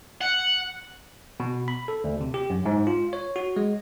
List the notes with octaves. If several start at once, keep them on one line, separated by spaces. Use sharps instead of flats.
F#5
B2
B5
A4
D2
C3
G4
F#2
G#2
F4
C#5
F#4
G#3